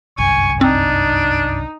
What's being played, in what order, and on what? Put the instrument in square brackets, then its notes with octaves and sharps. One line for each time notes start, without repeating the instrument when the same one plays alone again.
[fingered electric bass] G1 C2 F#2 [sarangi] G#5 [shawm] C#6
[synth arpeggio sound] C4 [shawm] D4 [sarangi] D#4